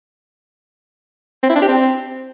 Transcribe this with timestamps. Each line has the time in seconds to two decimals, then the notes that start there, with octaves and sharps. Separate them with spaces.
1.43 C4
1.49 E4
1.56 D4
1.62 G4
1.68 C4